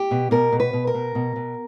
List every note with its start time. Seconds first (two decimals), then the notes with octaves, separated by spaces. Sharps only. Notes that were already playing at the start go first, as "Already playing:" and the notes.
Already playing: G4
0.11 B2
0.31 B2 A#4
0.52 B2
0.60 B4
0.73 B2
0.87 A#4
0.94 B2
1.15 B2
1.36 B2